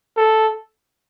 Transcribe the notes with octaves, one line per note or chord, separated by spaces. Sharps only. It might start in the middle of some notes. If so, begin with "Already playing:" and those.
A4